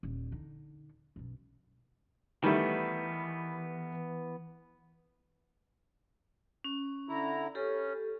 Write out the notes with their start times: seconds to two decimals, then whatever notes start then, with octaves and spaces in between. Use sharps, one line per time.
0.03 D#1
0.32 D3 D#4
1.16 B1 F#2
2.44 D#3 E3 G3 A3 B3
6.64 C#4
7.09 D3 E4 A#5
7.55 C#4 G4 A4